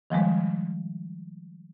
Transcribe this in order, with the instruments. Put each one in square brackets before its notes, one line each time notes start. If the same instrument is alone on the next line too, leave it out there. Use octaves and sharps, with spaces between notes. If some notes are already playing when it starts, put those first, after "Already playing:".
[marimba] D#3 F3 G3 G#3